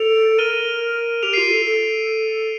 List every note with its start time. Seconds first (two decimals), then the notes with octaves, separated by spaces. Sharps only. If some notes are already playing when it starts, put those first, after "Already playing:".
Already playing: A4 D7 F7
0.38 A#4 D#7 G7
1.23 G4 D7 F7
1.33 F4 C7 D#7
1.50 A4
1.65 A4